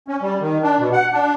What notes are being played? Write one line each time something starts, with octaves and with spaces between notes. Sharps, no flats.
C#4
G3
D#3
D4
B2
F#5
D4